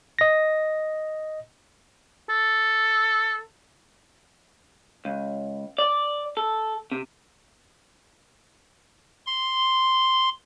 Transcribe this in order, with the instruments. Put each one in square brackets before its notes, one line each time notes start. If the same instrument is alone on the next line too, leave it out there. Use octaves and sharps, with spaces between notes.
[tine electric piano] D#5 A#6
[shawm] A4
[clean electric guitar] C#2
D5
A4
C3
[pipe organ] C6